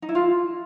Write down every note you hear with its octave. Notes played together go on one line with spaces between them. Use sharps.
D#4
E4
F4